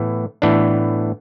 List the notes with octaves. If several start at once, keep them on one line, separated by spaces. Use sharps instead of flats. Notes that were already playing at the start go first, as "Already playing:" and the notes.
Already playing: A2 E3 B3
A2 E3 B3 D4